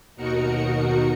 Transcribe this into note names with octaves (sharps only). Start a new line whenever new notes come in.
D#2 B2 D#4 F#4 A#4 C#7